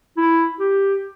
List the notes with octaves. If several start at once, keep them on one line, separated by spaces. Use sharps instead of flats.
E4
G4